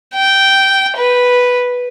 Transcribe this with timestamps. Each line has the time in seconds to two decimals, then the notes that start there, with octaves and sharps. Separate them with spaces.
0.14 G5
0.97 B4